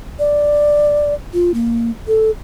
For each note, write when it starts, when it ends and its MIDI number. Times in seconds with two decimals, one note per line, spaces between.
0.19 1.14 74
1.33 1.51 65
1.54 1.91 58
2.08 2.30 69